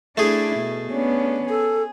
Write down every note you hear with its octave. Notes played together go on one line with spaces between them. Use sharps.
A3 D4 E4 G#4
B2
B3 C#4 D4
G#4 A4